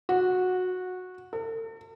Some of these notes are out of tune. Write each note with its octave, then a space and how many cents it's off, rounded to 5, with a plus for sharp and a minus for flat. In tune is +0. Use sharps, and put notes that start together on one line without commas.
F#4 -15
A4 +45